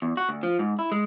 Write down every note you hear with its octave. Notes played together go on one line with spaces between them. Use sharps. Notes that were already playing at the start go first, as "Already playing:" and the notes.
E2
F#4
D2
F3
G#2
E4
G#3